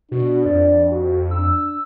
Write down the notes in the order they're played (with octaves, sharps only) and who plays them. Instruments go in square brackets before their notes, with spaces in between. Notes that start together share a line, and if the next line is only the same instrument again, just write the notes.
[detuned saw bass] B2 [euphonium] D4 [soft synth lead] F#4
[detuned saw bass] F2 [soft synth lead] D5
[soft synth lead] F#4
[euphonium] D4 [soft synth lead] E6